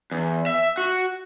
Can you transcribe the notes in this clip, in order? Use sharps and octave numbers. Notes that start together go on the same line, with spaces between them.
E2
E5
F#4